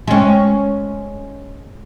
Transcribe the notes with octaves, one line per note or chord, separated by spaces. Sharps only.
G#3 C#4